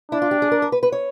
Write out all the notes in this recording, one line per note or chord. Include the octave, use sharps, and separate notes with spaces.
D4 E4
F4
G4
G#4
A#4
A#4
B4
B4
C#5